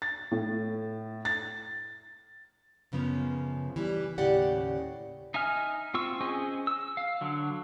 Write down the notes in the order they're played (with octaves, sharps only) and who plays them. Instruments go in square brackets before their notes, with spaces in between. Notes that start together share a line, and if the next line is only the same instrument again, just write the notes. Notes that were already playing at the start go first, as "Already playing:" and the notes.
[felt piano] A6
A2
A6
[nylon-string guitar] F#2 C#3 F3 B3
E3 G3
D#2 A2 C#3 G4 D5 F#5
[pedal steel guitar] D#4 E5 G#5 F6
C4 F4 C#6 E6
C#4 G#4 C5 D#5 G#5
E6
F5
D3 F#3